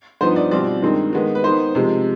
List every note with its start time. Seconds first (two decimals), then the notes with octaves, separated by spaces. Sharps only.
0.21 G2 F3 B3 D#4 C5
0.36 D5
0.51 B2 G3 C4 F4 D5
0.82 G2 D#3 G#3 C4 D#4
1.13 D#3 G#3 B3
1.35 B4
1.44 D#3 B3 D#4 C5
1.75 C3 F3 G#3